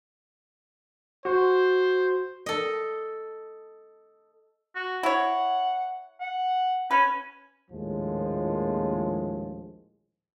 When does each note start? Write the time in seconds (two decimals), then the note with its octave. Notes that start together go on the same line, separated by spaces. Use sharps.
1.25 F#4 C5
2.46 A4 D#5
4.75 F#4
5.03 E4 C#5 F#5
6.20 F#5
6.91 C#4 B4
7.71 A#1 D#2 A2 F3 G#3